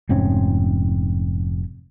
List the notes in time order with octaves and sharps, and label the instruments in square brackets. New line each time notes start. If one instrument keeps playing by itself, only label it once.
[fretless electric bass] F1 G#2 C4 C#4